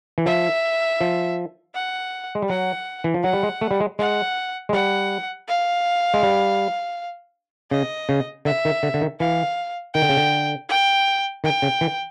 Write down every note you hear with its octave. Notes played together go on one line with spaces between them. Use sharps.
E3
F3 E5
F3
F#5
G#3
G3
F#3 F#5
E3
F3
F#3 F#5
G3
G#3
A3
G3
G#3
G#3 F#5
G#3
G3 F#5
F5
G#3
G3
C#3 D#5
C#3
D3 E5
D#3
D3
D3
D#3
E3 F5
D#3 G5
D3
C#3
D3
G5
D#3 G5
C#3
E3